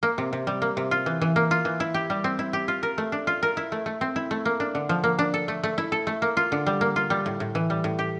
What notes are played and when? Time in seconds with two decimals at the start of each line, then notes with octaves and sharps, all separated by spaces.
0.03 A#3
0.18 C3
0.33 C3
0.47 G3
0.62 A#3
0.77 C3
0.91 F4
1.06 E3
1.21 E3
1.36 A#3
1.51 F4
1.65 E3
1.80 E4
1.94 G4
2.10 G3
2.24 C4
2.39 E4
2.53 G4
2.68 F4
2.83 A#4
2.98 A3
3.12 D4
3.27 F4
3.43 A#4
3.57 E4
3.72 A3
3.86 A3
4.01 C4
4.16 E4
4.31 A3
4.45 A#3
4.60 D4
4.75 D3
4.89 F3
5.04 A#3
5.19 D4
5.34 A4
5.48 A3
5.63 A3
5.78 E4
5.92 A4
6.07 A3
6.22 A#3
6.37 F4
6.52 D3
6.66 G3
6.81 A#3
6.96 F4
7.10 G3
7.26 A2
7.40 A2
7.55 E3
7.70 G3
7.84 A2
7.99 G4